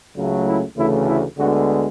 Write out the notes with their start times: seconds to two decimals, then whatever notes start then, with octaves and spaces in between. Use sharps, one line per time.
0.15 C#2 C#3 F#3 A3
0.47 E4
0.76 D2 C#3 E3 A3 E4
1.06 E4
1.38 D2 D3 G#3 B3 F#4